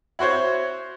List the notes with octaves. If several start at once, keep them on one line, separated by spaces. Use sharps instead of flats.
E4 F#4 C5 C#5